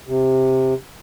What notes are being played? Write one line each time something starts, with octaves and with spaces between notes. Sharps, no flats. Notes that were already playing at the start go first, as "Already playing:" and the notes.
C3